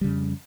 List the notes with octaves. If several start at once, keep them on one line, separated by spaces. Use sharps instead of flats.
F2 C#3 G3